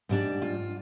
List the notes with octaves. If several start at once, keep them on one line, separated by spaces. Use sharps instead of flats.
G#2 G3 D4
F4